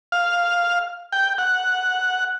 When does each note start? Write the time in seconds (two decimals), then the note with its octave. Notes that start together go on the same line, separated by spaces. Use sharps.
0.12 F5
1.12 G5
1.38 F#5